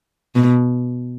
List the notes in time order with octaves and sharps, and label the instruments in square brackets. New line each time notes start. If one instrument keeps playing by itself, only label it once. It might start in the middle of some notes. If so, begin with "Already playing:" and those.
[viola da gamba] B2